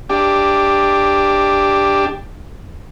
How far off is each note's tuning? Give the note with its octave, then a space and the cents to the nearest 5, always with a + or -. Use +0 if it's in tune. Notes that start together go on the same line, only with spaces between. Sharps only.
D4 +0 G4 +10